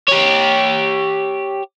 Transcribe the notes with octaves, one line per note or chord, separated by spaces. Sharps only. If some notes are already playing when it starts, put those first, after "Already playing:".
G4 C#5